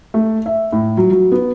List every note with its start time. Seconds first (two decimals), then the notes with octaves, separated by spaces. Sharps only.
0.14 A3
0.46 E5
0.72 A2
0.97 F#3
1.10 F#3
1.32 B3